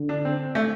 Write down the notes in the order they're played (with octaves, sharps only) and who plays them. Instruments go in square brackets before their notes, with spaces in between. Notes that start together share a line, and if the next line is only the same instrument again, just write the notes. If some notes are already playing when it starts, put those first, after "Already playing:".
Already playing: [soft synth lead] D3
[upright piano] D4
C4
A3